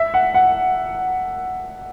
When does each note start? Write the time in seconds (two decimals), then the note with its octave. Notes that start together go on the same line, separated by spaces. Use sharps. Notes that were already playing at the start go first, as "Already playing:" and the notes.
Already playing: E5
0.14 F#5
0.34 F#5